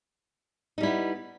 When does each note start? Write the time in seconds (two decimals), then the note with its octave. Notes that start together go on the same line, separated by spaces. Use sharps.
0.78 D#4
0.80 G3
0.83 E4
0.86 B3